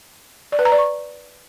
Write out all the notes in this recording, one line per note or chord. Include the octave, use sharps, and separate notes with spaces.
D5
B4
A#5
D5
C#6